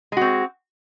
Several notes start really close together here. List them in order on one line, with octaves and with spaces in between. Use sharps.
G#3 F#4 C4